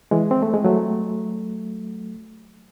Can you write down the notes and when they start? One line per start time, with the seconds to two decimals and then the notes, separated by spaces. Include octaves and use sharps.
0.11 E3 G#3
0.31 C4
0.42 A3
0.54 G#3
0.65 F#3 A3